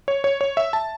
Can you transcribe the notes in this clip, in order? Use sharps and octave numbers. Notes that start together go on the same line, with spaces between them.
C#5
C#5
C#5
E5
A5